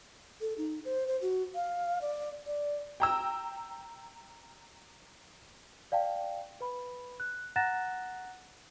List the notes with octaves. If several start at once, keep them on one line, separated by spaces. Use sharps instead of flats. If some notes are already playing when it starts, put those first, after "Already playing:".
A4
D#4
C5
C5
F#4
F5
D5
D5
G5 A#5 E6
D5 F5 G5 A5
B4 B5
F#6
F#5 A#5 F#6 A6 A#6 E7